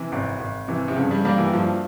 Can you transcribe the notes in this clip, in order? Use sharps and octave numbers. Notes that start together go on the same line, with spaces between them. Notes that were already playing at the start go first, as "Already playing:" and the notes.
Already playing: C3 E3
G#1 C3
G#1
C3 E3
C3
G2 C#3
G3
G3 A#3
E3
G2 F3